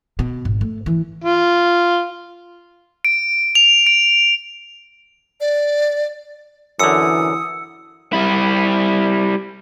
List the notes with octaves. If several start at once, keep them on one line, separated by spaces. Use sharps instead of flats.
B2
G#1
A3
E3
F4
D7
F7
D7
D5
F#2 D3 E3 D#6 E6 C#7
G3 E4